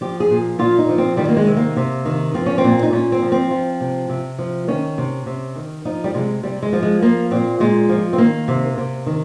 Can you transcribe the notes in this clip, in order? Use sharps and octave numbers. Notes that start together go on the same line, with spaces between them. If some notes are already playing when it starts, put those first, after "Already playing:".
F3 G4
G#4
A#2
A#2 F4
D#4
F3
C4
D#3 G3
A#3
G#3
C3
A#3
C3
D#3
F3 C4
C#4
C4
A#2
D#4
A#2 C#4
C4
F3
C4
F3
C3
C3
F3
D#3 C#4
C3
C3
D#3
F3 D#4
G3
C3 G#3
C3 G3
G#3
F3
G#3
F3 A#3
A#2 C4
A#2 G#3
F3
C4
D#3 A#3
C3
C3
D#3